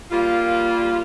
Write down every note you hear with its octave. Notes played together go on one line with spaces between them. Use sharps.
G3 A#3 F4